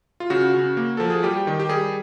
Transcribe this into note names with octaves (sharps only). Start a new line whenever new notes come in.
F4
C#3 F#4
C#3
A#3
F3 A4
G#4
G3 G4
D#3
G4
G3 G#4